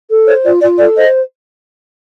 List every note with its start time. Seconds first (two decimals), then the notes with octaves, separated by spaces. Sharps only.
0.09 A4
0.27 C5 C#5
0.44 F4 D5
0.61 F4 D5
0.78 A4 D5
0.96 C5 D#5